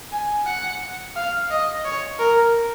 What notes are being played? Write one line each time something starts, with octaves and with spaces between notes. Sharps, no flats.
G#5
F#5
F5
D#5
C#5
A#4